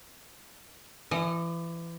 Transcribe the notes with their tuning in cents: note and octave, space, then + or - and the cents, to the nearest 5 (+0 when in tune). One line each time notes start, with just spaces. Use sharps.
E3 +30 D#5 -35